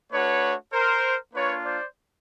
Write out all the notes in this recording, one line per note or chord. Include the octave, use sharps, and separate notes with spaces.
A3 D4 F#4 B4 C#5
A#4 C5
A#3 D4 F4 B4 C#5
C5 D5